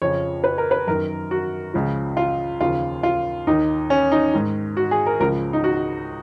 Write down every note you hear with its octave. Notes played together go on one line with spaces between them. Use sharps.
F2 C#3 F3 C#5
B4
A#4
B4
F#2 D#3 A#4
F#4
C#2 C#3 F3
F4
D#2 C#3 F3 F4
F4
D#2 D#3 D#4
C#4
D#4
G#2 D#3
F#4
G#4
A#4
C#2 C#3 F3 A#4
D#4
F#4